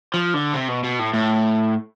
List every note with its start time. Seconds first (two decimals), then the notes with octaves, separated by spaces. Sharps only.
0.14 F3
0.34 D3
0.54 C3
0.68 B2
0.84 B2
0.99 A2
1.14 A2